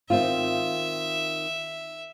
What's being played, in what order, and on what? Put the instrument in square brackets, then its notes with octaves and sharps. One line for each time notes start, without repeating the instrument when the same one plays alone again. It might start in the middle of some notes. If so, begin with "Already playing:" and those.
[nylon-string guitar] D#3 C4 F4 [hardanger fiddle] E5